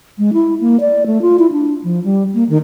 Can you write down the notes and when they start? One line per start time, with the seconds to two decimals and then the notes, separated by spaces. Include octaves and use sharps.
0.18 G#3
0.33 E4
0.61 A#3
0.80 D5
1.06 A3
1.22 F4
1.39 E4
1.52 D4
1.83 F3
2.04 G3
2.34 A#3
2.49 D#3